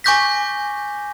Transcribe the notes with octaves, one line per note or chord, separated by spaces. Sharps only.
G#5 C#6 D6 G6 A#6 B6